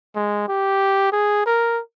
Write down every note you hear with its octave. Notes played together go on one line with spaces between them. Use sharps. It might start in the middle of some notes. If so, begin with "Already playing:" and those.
G#3
G4
G#4
A#4